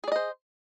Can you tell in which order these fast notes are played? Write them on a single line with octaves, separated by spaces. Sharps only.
G#4 D5 D#5 C5